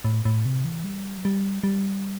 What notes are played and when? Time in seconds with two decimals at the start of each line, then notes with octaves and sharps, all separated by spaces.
0.05 A2
0.25 A2
0.45 C3
0.65 E3
0.84 G3
1.17 F#3
1.25 G3
1.64 G3